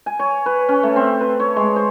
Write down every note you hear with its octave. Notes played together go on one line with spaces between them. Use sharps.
G#5
C#5
B4
C#4
A3
C4
B4
C#5
G#3
C5